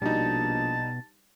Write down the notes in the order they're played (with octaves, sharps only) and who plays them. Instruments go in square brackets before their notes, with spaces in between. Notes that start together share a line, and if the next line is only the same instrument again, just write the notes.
[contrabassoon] A#1 [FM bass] B2 [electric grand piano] G3 D#4 [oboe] A5